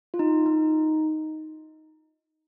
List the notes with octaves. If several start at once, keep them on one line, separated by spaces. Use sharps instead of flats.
F4
D#4
D#4